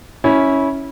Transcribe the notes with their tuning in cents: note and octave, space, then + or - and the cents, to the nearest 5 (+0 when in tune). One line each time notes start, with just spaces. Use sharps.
C#4 +0 E4 -20